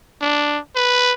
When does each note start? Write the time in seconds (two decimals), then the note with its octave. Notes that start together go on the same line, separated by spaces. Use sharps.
0.21 D4
0.76 B4